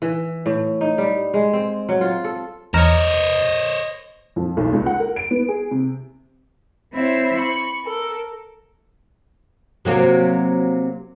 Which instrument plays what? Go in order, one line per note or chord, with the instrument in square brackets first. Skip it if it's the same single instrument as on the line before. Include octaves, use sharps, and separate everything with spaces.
[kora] E3
A2
D#4
G3
G#3
C4
F#3
F4
A4
[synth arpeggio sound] E2 A#5 F6 [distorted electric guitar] C5 C#5 [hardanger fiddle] D#5
[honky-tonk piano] F2
B1
C#2
F#5
A#4
D7
B3
G#4
C3
[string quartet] C4 E4 C5 C#5 E5
B5 C#6
A4 A#4
[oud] C3 F#3 A#3